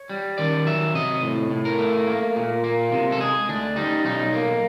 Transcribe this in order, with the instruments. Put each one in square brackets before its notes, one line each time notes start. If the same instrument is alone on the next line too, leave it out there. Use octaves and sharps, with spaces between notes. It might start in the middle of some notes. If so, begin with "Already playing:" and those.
Already playing: [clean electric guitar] C#5
G3
D#3 D5
F#3 E5
C3 D#5
A2
A2
A#4
A3
A#3
A#2
A#3
C3
A4
G#3 G#4
D2 D4
G3 D#4
B1 D#4
A#3